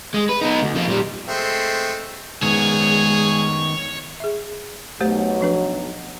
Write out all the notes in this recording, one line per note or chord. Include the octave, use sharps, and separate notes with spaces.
G#3
B4
B3 D#4
D2
F3 A#3
A#2 G3
G#3 A3 C4
D#3 G#3 B3 G#4 C#5
G#4 E5
B1 F#3 A3 G4 C5
F3 D4 B4